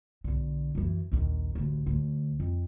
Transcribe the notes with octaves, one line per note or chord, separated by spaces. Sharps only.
B1 D3
F#2 E3
A#1 D#2
A1 D2
D2
F2